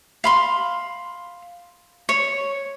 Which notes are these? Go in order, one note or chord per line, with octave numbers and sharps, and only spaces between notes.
F5 B5 C6
C#5